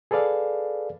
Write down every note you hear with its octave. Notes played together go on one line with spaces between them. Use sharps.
G#4 A4 B4 D5 F5